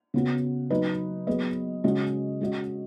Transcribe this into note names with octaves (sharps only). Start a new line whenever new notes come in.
C#3 B3 F#4
F#3 D#4 B4 D#5
F#3 B3 G#4 B4 D#5
C#3 G#3 C#4 F#4 D#5
G#3 C#4 F#4 D#5